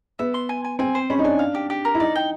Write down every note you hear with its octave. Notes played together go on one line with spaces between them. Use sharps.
B3 E5
C6
G#5
G#5
C4 G#5
C5
C#4 B5
D#4
D4 G#5
F5
G4
G4
A#4
E4
D#4 D5
G5